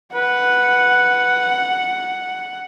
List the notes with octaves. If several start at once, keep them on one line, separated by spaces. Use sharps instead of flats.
B4 F#5